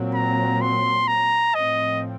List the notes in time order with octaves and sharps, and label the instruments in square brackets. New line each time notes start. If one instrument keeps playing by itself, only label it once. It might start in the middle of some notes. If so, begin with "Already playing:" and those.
Already playing: [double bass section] A#2 F#3 C4
[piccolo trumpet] A#5
C6
A#5
[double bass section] A2 F3 C4 [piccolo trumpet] D#5